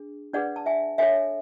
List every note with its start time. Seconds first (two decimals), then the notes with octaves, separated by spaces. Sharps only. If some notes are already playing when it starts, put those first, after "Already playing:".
Already playing: D4 G#4
0.34 D4 G#4 B4 D5 F#5
0.56 A5
0.66 E5 G#5
0.98 D4 A4 C#5 E5 G#5